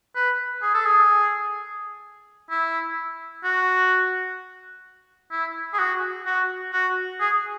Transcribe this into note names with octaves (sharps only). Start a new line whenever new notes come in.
B4
G#4
A4
G#4
E4
F#4
E4
G#4
F#4
F#4
F#4
G#4